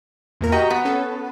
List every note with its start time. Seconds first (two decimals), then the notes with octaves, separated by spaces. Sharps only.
0.41 E2 A#2 A#4
0.52 F#4 G4 D#5 A#5
0.70 B3
0.85 C#4 A4